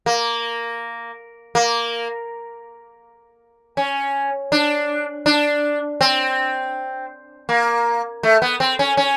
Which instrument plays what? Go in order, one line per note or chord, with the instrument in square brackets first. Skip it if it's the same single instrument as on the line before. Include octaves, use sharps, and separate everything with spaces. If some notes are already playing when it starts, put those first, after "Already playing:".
[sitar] A#3
A#3
C#4
D4
D4
C4
A#3
A3
B3
C4
C#4
C#4